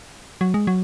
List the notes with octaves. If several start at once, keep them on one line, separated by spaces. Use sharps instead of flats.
F#3
G#3
F#3